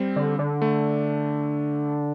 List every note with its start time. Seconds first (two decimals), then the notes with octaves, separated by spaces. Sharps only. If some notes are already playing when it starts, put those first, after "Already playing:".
Already playing: G3 C4
0.16 D3
0.39 D3
0.62 A3